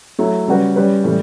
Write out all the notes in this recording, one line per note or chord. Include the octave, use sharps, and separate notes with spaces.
F#3 A3 E4
C#3 G3 C#4 F#4 B4
G3 C#4 G4 B4
A2 E3 G3